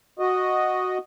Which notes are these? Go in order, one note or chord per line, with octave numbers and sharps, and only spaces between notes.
F#4 D#5